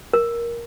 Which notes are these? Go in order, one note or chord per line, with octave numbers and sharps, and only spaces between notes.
A#4